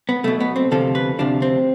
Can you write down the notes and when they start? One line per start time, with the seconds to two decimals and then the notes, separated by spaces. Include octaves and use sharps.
0.09 B3
0.24 B1 B2 A3
0.40 B3
0.56 C4
0.71 D2 C3 F3 A4
0.95 B4
1.19 D2 C3 F3 D4
1.42 C4